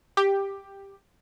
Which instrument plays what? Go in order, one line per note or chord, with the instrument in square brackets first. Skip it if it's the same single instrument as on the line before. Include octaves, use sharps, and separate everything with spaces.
[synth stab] G4